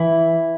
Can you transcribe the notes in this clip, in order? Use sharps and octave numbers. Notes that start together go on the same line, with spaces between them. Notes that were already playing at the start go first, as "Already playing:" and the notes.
Already playing: E3 E4